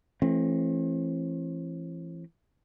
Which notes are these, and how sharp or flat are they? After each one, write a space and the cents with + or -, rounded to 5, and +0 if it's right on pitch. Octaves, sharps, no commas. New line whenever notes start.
E3 +35 A3 +0 C4 +45